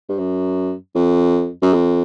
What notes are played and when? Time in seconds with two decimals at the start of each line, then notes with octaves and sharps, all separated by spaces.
0.09 G2
0.18 F#2
0.95 F2
1.62 F#2
1.73 F2